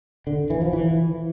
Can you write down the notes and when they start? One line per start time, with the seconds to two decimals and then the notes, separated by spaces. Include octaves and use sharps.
0.27 D3
0.50 E3
0.61 F3
0.73 E3